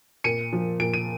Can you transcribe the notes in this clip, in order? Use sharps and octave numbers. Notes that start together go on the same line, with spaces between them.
A#2 C#7 D#7
F3
A#2 D7
D#7